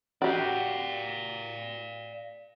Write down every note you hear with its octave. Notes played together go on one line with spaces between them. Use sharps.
F#4 G4 D5 F5